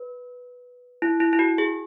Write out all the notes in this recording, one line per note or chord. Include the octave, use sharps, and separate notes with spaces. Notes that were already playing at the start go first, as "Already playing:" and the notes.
Already playing: B4
E4
E4
E4
F#4
G#4